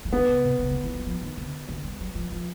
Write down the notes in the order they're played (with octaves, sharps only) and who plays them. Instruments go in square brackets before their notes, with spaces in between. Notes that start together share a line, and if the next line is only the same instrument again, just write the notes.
[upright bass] E3
[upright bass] D#3 [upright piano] B3
[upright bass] C#3
C3
C#3
D3
E3
F3
F3
D#3
D3
D3
G3
F#3
F3
F3